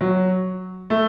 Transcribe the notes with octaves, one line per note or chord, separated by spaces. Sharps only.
F#3
A3